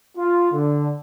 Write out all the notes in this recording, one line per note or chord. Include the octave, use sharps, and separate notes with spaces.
F4
D3